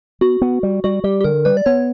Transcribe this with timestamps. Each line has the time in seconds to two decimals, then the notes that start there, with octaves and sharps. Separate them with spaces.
0.21 B3 F#4
0.41 B3
0.63 G3
0.84 G3 F#4
1.04 G3 G4
1.21 G4
1.24 D3 A#4
1.45 G3 B4
1.57 D5
1.66 B3 C#5